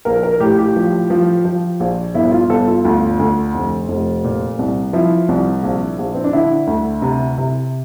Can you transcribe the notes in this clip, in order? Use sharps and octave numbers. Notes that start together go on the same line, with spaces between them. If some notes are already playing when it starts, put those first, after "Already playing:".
A#1 A#4
A#4
A2 G4
G4
F3
F3
F3
A#1
G1 E4
F4
G1 A4
F4
D2 F4
D2
F1
F1
A#2
C2
F3 E4
C2
A#1
A#1
C4
D4
D3 E4
D2
C3
C3